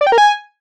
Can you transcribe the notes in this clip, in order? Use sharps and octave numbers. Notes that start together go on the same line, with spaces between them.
D5
G5
A#4
G#5